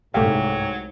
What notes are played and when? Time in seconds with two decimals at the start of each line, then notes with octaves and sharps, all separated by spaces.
0.14 C2 G#2 F#3 A3 G4 F5